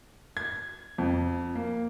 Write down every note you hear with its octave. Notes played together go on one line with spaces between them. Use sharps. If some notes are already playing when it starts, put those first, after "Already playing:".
G#6
F2
A#3